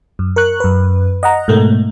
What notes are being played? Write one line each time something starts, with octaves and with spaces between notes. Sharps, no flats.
F#2
A#4 C#6 F#6
F#2 B4
D#5 F#5 A#5
G#2 B2 A3 A#3